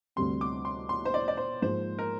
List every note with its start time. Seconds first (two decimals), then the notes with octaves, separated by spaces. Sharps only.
0.16 D2 C3 G3 C4 C6
0.41 D6
0.65 C6
0.89 C6
1.05 C5
1.14 D5
1.28 D5
1.37 C5
1.62 G#2 F3 A#3 C5
1.99 A#4